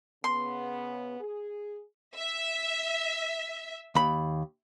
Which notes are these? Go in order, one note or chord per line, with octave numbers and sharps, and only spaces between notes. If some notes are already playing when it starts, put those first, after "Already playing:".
C#3 B3 C6
G#4
E5
D#2 B5